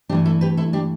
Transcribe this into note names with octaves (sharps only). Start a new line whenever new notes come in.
G2 E3 A3 D4 G4
E4 A4
G4 B4
E4 A4
D4 G4